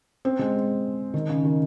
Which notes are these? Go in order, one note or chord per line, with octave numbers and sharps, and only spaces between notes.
C4
G#3
D#3
C#3
D#3